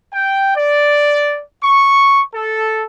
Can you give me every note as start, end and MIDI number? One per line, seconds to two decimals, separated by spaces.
0.12 0.54 79
0.56 1.41 74
1.64 2.21 85
2.35 2.83 69